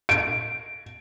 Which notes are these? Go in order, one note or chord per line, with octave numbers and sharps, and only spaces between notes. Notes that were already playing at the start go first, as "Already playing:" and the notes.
D7